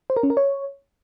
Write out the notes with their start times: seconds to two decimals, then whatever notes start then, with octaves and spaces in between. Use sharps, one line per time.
0.10 C5
0.16 A#4
0.23 C#4
0.30 A#4
0.37 C#5